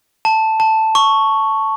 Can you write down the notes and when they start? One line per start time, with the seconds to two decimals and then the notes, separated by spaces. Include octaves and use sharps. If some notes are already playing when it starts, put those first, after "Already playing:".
0.25 A5
0.60 A5
0.95 C#6